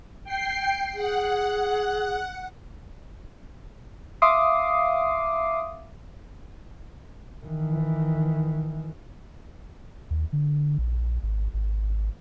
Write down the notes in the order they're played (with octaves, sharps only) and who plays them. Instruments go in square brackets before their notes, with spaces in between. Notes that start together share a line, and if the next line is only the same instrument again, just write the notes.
[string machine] G5 C7
[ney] G#4 [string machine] F#5
[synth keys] E5 F5 C6 D6 D#6 C7
[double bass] D#3 E3
[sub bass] D#2
D3
A#1
G#1
G#1